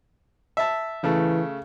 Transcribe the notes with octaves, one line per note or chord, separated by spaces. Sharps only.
E5 A5
C#3 E3 A3